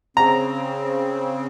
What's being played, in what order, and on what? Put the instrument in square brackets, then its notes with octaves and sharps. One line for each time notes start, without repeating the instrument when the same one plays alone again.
[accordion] C#3 C4 [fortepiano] A#5